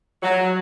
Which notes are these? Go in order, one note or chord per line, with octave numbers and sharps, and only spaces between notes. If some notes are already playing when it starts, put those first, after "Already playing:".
F#3